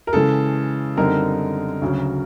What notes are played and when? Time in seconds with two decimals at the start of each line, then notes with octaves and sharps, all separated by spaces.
0.07 A#4
0.13 C#3 E3 G#3 A4
0.97 F#2 D3 G3 C4 D#4 A#4
1.82 D2 C#3 F#3